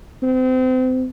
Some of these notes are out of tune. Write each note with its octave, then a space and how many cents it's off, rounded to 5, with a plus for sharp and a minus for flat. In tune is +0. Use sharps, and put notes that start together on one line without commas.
C4 -30